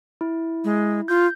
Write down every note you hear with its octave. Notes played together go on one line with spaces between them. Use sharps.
E4
G#3
F4 G6